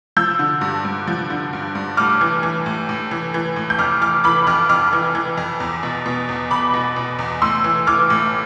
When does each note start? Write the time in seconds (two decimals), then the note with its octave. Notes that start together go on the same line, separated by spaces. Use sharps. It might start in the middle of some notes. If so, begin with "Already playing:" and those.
0.17 F3 E6 G6
0.39 D3
0.61 G2
0.85 G2
1.07 F3
1.30 D3
1.53 G2
1.75 G2
1.97 A2 D6 F6
2.21 E3
2.43 E3
2.66 A2
2.89 A2
3.11 E3
3.34 E3
3.56 A2
3.70 G6
3.78 F2 D6 F6
4.02 E3 D6 F6
4.24 E3 B5 D6
4.47 F2 D6 F6
4.69 F2 D6 F6
4.93 E3
5.15 E3
5.37 F2
5.60 E2
5.83 B2
6.06 B2
6.29 E2
6.51 E2 B5 D6
6.74 B2
6.96 B2
7.19 E2
7.42 A2 C6 E6
7.64 E3
7.87 E3 D6 F6
8.10 A2